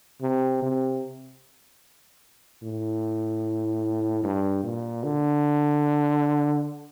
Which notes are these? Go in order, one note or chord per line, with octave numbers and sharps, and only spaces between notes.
C3
C3
A2
G2
A#2
D3